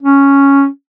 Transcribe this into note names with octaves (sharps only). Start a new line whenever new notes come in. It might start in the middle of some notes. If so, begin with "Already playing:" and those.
C#4